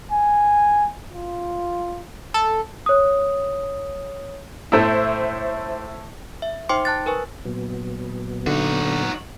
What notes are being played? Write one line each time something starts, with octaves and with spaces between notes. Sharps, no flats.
G#5
F4
A4
C#5 D#6
A2 A3 E4 C5 E5
E5
D#4 C5 G5 C6 D6 C#7
A5 F#6 A6
A#4 B4 G#5 C#6
A#2 F#3 B3
D3 D#4 F#4